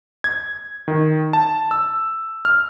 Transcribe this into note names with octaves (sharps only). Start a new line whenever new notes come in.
G#6
D#3
A5
E6
F6